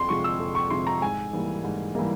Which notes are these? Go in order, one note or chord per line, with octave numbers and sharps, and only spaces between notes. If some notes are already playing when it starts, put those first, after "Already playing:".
Already playing: F2 C6
C3 F3 G#3 C#6
E6
F2
C#6
C3 F3 G#3 C6
A#5
G#2 G#5
E3 G3 A#3
G#2
E3 G3 A#3